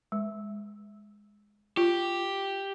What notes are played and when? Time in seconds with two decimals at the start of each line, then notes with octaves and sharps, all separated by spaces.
0.12 G#3
1.77 F4 G4